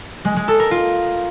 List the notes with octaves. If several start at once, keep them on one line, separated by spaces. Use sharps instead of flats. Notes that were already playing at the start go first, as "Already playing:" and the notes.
G#3
G#3
A4
A#4
F4